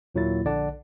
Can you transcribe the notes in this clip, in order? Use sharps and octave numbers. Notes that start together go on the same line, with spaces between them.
D#2 A#2 F#3 A#3 E4 A6
A#1 D3 D5 F#5 A5